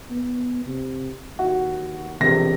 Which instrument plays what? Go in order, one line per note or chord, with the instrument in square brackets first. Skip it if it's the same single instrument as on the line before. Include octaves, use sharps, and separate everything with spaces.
[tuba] B3
C3
[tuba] D#2 [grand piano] F#4
[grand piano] E1 C3 A#6 [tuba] F2